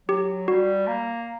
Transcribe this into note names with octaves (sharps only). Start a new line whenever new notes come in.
F#3 G4
G3 F#4
A#3